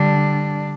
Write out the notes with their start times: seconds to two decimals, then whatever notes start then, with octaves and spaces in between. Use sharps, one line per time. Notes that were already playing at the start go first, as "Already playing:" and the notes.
Already playing: D3 G3 D4